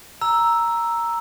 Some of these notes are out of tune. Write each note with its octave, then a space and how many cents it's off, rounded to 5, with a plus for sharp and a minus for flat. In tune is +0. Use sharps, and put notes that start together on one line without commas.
A#5 +0 E6 +0